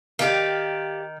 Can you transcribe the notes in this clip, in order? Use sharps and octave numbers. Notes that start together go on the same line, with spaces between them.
D#3 G4 D5 F5